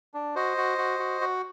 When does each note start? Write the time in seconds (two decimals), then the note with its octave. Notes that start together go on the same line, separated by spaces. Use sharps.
0.14 D4
0.36 F#4 C5 D#5
0.57 F#4
0.78 F#4
1.00 F#4
1.21 F#4